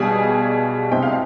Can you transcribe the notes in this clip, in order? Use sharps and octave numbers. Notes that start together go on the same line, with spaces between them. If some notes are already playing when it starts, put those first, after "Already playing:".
Already playing: B1 B2 G3 G#4 G#5
C2 B2 G#3 C4 G5
F5